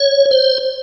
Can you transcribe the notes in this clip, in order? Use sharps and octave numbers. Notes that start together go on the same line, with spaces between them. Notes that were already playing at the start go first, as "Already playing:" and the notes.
Already playing: C#5
C5